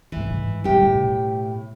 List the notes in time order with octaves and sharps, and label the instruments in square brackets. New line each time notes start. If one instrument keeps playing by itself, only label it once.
[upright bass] D#2 G#2 [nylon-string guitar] E3
[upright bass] G#2 D#3
[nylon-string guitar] A2 G4 [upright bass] D3 G3
[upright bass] B2